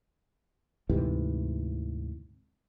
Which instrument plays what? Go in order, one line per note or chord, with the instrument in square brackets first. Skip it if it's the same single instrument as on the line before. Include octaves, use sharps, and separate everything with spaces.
[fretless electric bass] D2 G#2 C3 E3